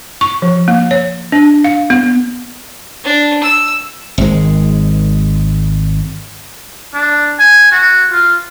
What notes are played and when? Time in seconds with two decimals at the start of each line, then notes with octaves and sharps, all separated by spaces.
0.21 C#6
0.42 F3
0.68 A#3
0.91 C#5
1.32 D4
1.64 F5
1.90 B3
3.04 D4
3.44 E6
4.18 G#1 G#3
6.94 D4
7.39 G#5
7.71 F#4
8.12 F4